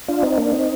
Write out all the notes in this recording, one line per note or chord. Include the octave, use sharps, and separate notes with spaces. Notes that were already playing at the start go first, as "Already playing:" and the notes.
D4 F4
C4 D#4
A#3 D4
C4 D#4